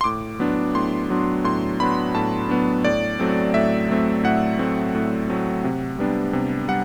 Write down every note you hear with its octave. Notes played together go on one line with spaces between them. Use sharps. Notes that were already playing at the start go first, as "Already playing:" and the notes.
C6
A2 D6
F#3 B3 D4
A2 C6
F#3 B3 D4
A2 C6
F#3 B3 D4 B5
A2 A5
F#3 B3 D4
A2 D5
F#3 A3 C4
A2 E5
F#3 A3 C4
A2 F#5
F#3 A3 C4
A2
F#3 A3 C4
C3
G3 B3 D4
C3
G3 F#5